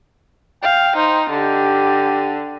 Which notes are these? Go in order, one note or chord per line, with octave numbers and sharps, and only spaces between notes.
F5 G5
D#4 C5
D3 G4